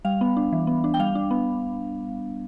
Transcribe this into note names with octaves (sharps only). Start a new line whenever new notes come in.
G3 F5
B3
D4
E3
B3
D4
G5
G3 F5
D4
B3